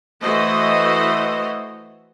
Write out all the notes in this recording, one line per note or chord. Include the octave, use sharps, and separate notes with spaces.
E3 A3 F#4 C5 D#5